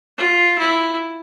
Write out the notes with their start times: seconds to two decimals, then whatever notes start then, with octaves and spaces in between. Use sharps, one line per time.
0.18 F4
0.58 E4